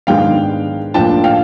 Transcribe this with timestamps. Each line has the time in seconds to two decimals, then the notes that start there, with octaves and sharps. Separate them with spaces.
0.07 G#2 D#3 G#3 B3 D4 F5 G5
0.94 A2 F3 A#3 D4 F4 G5 A5
1.24 F5 G5